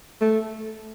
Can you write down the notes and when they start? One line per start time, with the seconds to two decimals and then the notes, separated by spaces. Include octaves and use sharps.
0.21 A3